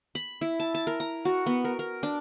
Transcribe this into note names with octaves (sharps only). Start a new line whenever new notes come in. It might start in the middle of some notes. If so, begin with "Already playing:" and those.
B5
E4
A5
A5
A#4
A#5
F#4
B3
A#4
A#4
D4